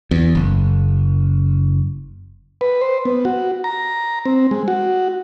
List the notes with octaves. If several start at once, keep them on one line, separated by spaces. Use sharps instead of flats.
E2
F#1
B4
C5
B3
F#4
A#5
C4
G#3
F#4